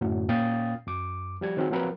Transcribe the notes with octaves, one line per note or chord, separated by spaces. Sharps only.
F#2 A2 D3 F#3
A#2 C#4 F5 G5 D#6 A6
F#2 D6
F3 G3 G#6
D#3 F#3 C4 F#4 G#4
F3 F#3 C4 A#4 B4